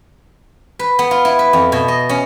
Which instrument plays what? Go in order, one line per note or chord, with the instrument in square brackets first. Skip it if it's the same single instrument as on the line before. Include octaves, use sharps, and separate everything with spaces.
[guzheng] B4
B3
F4
E4
B4
F2
B2
D#5
C#4